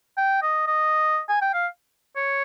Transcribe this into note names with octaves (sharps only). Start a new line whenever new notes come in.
G5
D#5
D#5
G#5
G5
F5
C#5